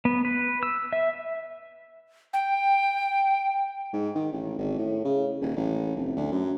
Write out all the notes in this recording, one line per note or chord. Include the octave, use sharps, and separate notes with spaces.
B3
B4
E6
E5
G5
G#2
D#3
A1
G#1
A2
C#3
D#1
A1
F1
D2
F#2